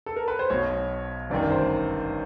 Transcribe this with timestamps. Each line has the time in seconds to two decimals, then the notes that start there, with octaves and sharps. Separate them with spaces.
0.06 A4
0.16 A#4
0.28 B4
0.39 C5
0.50 B1 B2 C#5
1.30 G1 F#2 D#3 D5
1.51 C5